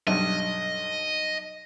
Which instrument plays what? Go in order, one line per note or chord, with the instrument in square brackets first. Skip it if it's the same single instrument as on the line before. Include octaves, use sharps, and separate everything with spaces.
[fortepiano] B1 G2 [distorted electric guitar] D#5